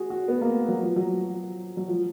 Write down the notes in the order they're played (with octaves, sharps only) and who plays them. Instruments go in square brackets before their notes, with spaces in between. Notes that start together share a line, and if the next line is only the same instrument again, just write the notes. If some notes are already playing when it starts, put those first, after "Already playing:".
Already playing: [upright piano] F#4 G#4
F#4
B3
A#3
F#3
F3
F#3
F#3
F3